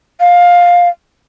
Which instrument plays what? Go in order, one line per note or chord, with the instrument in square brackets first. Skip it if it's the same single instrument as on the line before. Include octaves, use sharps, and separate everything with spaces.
[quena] F5